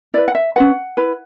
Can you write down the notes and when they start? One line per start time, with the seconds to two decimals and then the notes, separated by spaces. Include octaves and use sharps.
0.14 E4 B4 D5
0.28 F#5
0.35 E5
0.56 C#4 F#4 B4 F#5
0.97 E4 B4